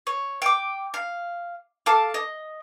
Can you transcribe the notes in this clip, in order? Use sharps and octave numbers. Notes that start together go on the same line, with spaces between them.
C#5
G5 D6
F5
A4 F5 A5 D6
D#5